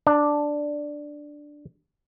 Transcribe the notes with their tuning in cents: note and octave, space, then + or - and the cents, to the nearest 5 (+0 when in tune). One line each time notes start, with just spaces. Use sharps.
D4 +0 A#5 -45